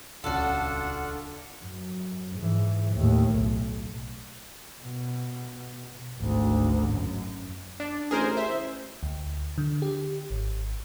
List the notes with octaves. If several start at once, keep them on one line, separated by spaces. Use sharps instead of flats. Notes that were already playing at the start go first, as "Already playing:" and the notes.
D#1 C#2 C#4 D4 F4 F#4 A4 F#5
F#2
G#2 E3
D#2 A2
B1
B2
G#1 D2
F#2
D4
A1 G#4 A#4 C5
C5 E5
D2
D3
G4
G#1